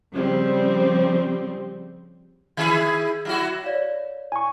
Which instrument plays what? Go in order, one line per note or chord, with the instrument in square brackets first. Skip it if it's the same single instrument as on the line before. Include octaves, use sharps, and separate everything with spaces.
[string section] C#3 F3 G3 C4
[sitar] D#3 E4 G#4
F#3 E4 F#4
[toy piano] C#5 D5 F5
[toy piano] E4 [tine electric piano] G#5 C#6